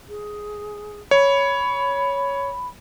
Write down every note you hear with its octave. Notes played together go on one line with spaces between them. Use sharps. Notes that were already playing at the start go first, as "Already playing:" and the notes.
G#4
C#5 B5